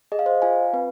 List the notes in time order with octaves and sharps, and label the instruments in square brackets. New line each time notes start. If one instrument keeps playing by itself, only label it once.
[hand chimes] G#4 D#5
F5
C5 D#5
F4 F5 G#5
C4 B4